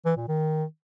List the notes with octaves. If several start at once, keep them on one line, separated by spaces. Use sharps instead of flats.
E3
A#2
D#3